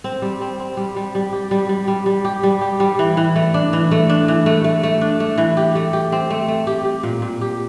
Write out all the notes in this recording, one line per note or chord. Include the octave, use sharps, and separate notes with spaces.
C4
G3
C4
C4
G3
G3
G3
G4
G3
G3
G3
G3
G4
G3
G4
G3
E3
E3
A3
D4
E3
A3
D4
E3
A3
A3
A3
D4
A3
E3
G4
A3
G4
C4
A3
A3
G4
G4
A#2
A#2
G4